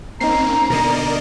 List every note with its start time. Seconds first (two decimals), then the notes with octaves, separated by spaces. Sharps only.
0.20 A#3 C4 C#4 D#4 A#5 C7
0.70 B2 D3 A#4 D5 D#5